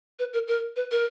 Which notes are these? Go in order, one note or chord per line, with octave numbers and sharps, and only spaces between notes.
B4
A#4
A#4
B4
A#4